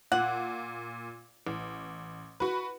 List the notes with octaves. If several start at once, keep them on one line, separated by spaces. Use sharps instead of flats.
A#2 F#5
A1
F#4 B4